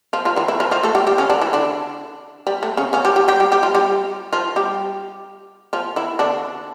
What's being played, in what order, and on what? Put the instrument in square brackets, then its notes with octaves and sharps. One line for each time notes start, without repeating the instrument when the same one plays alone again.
[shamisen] F3 F4
F3 F4
E3 E4
E3 E4
F3 F4
F3 F4
A3 A4
G3 G4
G3 G4
C#3 C#4
D3 D4
E3 E4
D3 D4
G3
A3
C#3 C#4
C#3 C#4
G3 G4
G3 G4
G3 G4
G3 G4
G3 G4
F3 F4
G3 G4
F3 F4
G3 G4
F3 F4
E3 E4
D3 D4